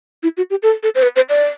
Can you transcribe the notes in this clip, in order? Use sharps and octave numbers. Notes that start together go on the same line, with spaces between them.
E4
F#4
G4
A4
A4
C5
B4
C5
D5